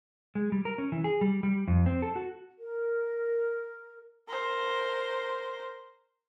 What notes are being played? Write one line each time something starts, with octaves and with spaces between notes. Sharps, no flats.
G#3
G3
A#4
C#4
E3
G#4
G3
G3
F2
C4
A4
F#4
A#4
A#4 C5